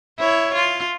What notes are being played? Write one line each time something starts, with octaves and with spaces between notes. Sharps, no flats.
E4 C#5
F4